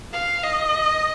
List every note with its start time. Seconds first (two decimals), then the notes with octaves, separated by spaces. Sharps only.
0.14 F5
0.43 D#5